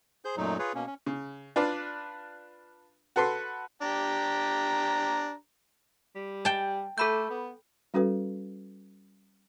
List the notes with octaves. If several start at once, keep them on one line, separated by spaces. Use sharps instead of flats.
G#4 C5 G6
F#2 A#2 F#3 A3 D#4
F4 G#4 B4 C#5
B2 A#3 C#4
C#4
C#3
D4 F4 B4 D5
F#4 A4 B4 B5 C6
D4 G4 A#5
G3
G5 A5
A3 A4 B5 G6
B3
G3 C#4 F#4 A4 B4